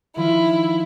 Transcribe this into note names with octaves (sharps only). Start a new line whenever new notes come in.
D#3 F3 E4 F4